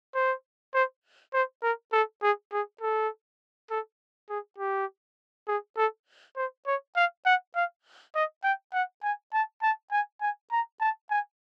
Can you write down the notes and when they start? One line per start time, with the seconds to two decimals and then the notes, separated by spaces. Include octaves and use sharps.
0.15 C5
0.74 C5
1.34 C5
1.63 A#4
1.93 A4
2.22 G#4
2.52 G#4
2.81 A4
3.71 A4
4.30 G#4
4.59 G4
5.48 G#4
5.77 A4
6.36 C5
6.66 C#5
6.96 F5
7.26 F#5
7.55 F5
8.15 D#5
8.44 G5
8.73 F#5
9.03 G#5
9.33 A5
9.62 A5
9.92 G#5
10.21 G#5
10.52 A#5
10.81 A5
11.10 G#5